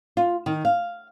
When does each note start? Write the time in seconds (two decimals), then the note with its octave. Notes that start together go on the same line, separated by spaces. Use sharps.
0.17 F4
0.46 D#3
0.65 F5